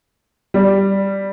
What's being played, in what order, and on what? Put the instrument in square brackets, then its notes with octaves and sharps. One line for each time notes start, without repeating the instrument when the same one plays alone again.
[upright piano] G3